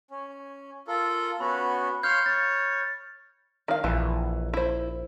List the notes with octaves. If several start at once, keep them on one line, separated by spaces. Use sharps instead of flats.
C#4
F4 A4 A#4
B3 C#4 F#4 B5
C#5 F5 C6 F6 G6
C#5 A6
D#3 F5
A#1 E3
E4 C5